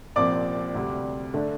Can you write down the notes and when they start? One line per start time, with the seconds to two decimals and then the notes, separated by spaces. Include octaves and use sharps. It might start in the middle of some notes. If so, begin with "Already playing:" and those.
0.16 C2 A#2 F3 C4 D5 D6
0.75 D2 C3 G3
1.34 D3 A3 D4